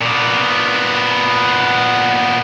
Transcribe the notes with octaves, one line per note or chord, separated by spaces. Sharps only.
A#2 B3